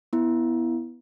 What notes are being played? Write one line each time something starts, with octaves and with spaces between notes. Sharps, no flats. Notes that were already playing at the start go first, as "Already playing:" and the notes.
B3 E4